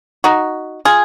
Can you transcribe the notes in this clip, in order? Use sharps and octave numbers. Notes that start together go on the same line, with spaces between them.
D#4 F#4
F4 G#4